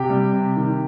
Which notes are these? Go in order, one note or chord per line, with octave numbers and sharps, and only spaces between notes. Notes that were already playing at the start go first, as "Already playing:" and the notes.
Already playing: C3 G4 G5
G3
C3
D#3